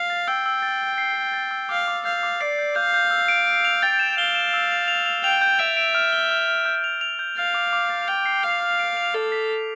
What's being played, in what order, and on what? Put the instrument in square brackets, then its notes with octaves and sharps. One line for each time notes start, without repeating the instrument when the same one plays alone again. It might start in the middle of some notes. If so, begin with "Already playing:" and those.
Already playing: [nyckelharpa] F5 [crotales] C7
[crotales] A6
[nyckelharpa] G5 [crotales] E6
[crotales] E6
A6
E6
C7
C7
A6
E6
[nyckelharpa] F5 [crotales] D6
[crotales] D6
[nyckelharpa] F5 [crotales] G6
[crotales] D6
[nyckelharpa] D5 [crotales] C7
[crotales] G6
[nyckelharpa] F5 [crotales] G6
[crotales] G6
E6
D7
D7
F7
[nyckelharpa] G5 [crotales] A6
[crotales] E7
[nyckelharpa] F5 [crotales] G7
[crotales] E7
E6
F7
F7
F7
[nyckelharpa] G5 [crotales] F7
[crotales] G6
[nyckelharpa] E5 [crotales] D7
[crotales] D7
F6
G7
F6
F6
G6
F7
F7
G6
[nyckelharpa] F5 [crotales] A6
[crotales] D6
D6
A6
[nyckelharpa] G5 [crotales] F7
[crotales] C7
[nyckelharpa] F5 [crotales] F6
[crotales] F6
D7
F7
[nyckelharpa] A4 [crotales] F6
[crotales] B6
B6